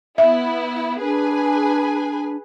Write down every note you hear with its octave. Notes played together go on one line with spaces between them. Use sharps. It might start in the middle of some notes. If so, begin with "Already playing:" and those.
B3 E4 E5
D4 G#4 B4 G#5